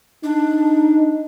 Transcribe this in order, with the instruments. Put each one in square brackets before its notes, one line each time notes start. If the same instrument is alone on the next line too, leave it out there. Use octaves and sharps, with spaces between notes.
[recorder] D4 [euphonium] D#4